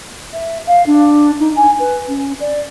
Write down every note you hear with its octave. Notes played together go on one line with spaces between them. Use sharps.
E5
F5
D4
D#4
G#5
B4
C#4
D5